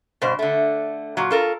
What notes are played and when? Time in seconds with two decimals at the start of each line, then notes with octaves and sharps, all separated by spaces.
0.22 G2 B2 C5
0.39 D3 A3
1.17 A#2 F#3
1.31 F4 A4 A#4